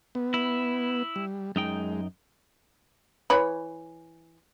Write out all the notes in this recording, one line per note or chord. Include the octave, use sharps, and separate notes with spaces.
B3
E4
G3
F#2 G#3 D#4 G5
E3 C#5 B5